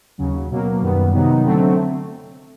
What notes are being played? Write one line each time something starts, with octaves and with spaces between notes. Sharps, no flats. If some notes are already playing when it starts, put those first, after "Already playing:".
D#2 C#3 F#3
B2 F#3 A#3
F#2 D#3 G3 B3
C3 D#3 F#3 B3 D#4
D3 F#3 A3 C4